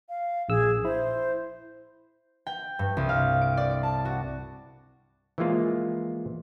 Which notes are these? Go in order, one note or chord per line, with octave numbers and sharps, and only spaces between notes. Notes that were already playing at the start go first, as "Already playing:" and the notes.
F5
A#1 G#4 E6
E4 C5
G5
G2
C2
F5
D7
D5
D7
A5
F#4
E3 F3 G#3 A#3 F4